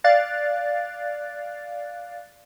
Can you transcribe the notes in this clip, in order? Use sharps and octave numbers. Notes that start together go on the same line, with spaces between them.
D5 F5 F#6 A6